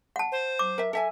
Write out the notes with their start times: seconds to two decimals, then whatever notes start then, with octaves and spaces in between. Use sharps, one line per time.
0.16 F#5 A5
0.32 C5
0.59 D6
0.78 A#4 E5
0.93 A4 E5 G#5